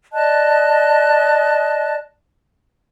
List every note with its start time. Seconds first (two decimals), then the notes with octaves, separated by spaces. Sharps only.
0.13 D5 D#5 A5 F#6